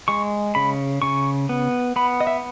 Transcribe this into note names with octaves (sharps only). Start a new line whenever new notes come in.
G#3 C#6
C#3 B5
C#3 C#6
B3
B3 B5
D#5
E5